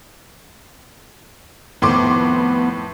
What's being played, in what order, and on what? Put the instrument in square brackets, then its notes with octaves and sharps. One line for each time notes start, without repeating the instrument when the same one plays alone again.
[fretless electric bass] F2 D#3 C4 [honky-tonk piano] A2 C6 D6 [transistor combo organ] B3